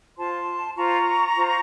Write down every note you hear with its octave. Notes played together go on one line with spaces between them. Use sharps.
F4 C5 A5 C6
F4 C5 A#5 C#6
F4 C5